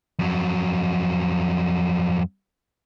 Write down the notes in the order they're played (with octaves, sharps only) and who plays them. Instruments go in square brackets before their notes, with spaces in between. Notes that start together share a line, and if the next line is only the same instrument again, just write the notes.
[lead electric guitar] F2 F#3